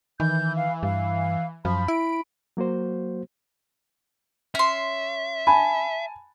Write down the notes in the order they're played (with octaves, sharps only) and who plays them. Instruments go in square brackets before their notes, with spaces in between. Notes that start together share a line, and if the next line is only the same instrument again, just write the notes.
[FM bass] D#3 [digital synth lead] E3 [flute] G6
[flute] F5
[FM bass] G2 [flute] F5
[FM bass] F#2 [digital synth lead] F3 [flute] B5
[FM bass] E4 [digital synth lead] D7
[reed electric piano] F#3 A#3 F#4 C5
[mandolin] C#4 C6 [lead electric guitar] E5
[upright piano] G#5 A5 [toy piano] B5